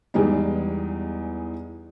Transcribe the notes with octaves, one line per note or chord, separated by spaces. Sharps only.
E2 E3 G3 G#3 D#4